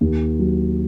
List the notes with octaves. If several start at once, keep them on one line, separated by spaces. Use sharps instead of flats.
D#2
F#3